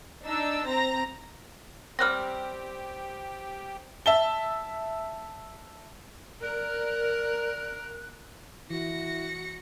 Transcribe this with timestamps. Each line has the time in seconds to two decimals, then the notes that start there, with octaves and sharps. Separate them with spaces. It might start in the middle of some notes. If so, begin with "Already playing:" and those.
0.24 D4 D#4 E6
0.65 C4 A#5 A#6
1.99 G3 C4 G4 F6 F#6 A#6
4.06 E5 A5 G7
6.42 A#4 D5 F#6
8.70 E3 E4 F#4 A#6 C#7